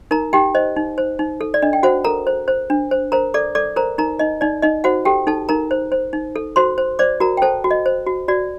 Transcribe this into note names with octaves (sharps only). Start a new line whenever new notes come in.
D#4 A#4 A#5
D#4 G4 G5
C5 D#5
D#4
C5
D#4
A4
D5
D4 D#5
G5
F#4 C5 F#5
A4 A#4 A#5
C5
C5
D4
C5
A#4 C5 A#5
A4 D5 D6
A4 D5 D6
A#4 C5 A#5
D#4 A#4 A#5
D#4 D#5
D#4 D5
D#4 D#5
F#4 C5 F#5
G4 A4 G5
D#4 A4 A5
D#4 A#4 A#5
C5
C5
D#4
A4
F#4 C5 C6
C5
C5 D5 D6
F#4 A#4 A#5
G5
A4 C5 A5
F#4
D#5
C5
F#4
F#4 D5